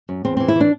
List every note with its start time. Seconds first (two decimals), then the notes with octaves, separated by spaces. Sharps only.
0.09 F#2
0.25 E2 C4
0.37 E3 C4
0.48 E4
0.56 E3 D4